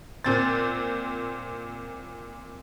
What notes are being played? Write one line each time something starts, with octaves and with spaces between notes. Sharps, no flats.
A#2 C4 A6